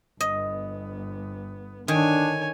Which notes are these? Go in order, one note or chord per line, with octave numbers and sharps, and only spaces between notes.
G1 B3 D#5
D3 D#3 D4 C#5 G#5